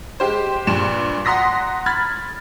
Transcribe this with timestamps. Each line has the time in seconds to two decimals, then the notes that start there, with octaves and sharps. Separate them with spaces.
0.20 G#3 G4 C5
0.67 G2 A#2 E7
1.25 F#5 A#5 C6 D#6 A#6 B6
1.86 B5 F6 G#6 A6